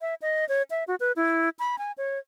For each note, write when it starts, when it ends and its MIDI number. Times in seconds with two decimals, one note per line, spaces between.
0.01 0.14 76
0.22 0.47 75
0.49 0.63 73
0.71 0.84 76
0.88 0.95 66
1.00 1.12 71
1.16 1.49 64
1.59 1.78 83
1.78 1.92 80
1.98 2.19 73